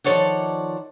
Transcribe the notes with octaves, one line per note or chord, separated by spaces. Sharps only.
D#3 F3 A4 C#5 D5 F#5